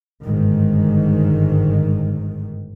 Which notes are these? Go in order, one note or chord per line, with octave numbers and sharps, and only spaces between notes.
G1 G#2 D#3